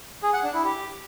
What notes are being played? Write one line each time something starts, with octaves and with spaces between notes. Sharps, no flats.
G#4
F#5
D4
E4
G4